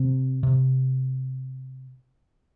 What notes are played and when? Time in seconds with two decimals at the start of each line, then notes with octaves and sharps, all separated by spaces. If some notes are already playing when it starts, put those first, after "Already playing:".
Already playing: C3
0.43 C3